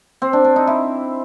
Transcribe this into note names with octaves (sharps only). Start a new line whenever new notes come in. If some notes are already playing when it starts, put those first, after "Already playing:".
C4
D4
D4
D#4
E4